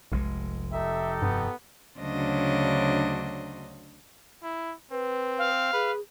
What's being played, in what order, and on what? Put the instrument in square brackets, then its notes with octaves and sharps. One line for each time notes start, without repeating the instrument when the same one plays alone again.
[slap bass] F1 G#3 [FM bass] B1
[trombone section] D#4 G4 A4 [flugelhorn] E5
[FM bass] G2 [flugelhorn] B3
[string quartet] D2 C#3 F#3 D4 C5 D#5
[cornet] E4
[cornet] C4 [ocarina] B4
[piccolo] F5
[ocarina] G#4 [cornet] B4